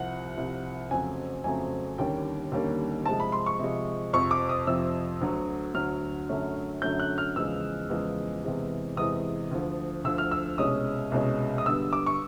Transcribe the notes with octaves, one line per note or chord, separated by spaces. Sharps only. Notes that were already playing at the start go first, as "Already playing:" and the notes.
Already playing: C2 C3 F3 F#5
C2 C3 F3
F2 C#3 F#3 A3 C4 G#5
F2 C#3 F#3 A3 C4 G#5
D#2 D3 G3 A#3 C#4 G5
D#2 D3 G3 A#3 C#4
C3 F3 G#3 A5
B5
C6
C#6
C3 F3 G#3
F2 C3 F3 C#6
D6
D#6
F2 C3 F3 E6
D2 D3 F#3
D2 D3 F#3 F6
F#2 D3 F#3 A3 C#4
F#2 D3 F#3 A3 C#4 G6
F#6
F6
E2 C#3 F3 G#3 E6
E2 C#3 F3 G#3
E2 C3 E3 G#3 C4
E2 C3 E3 G#3 C4 D#6
D2 D3 F3
D2 D3 F3 E6
F6
E6
C2 B2 G#3 C#4 D#6
C2 B2 G#3 C#4
D#6
G2 D3 G3 B3 E6
D6
C#6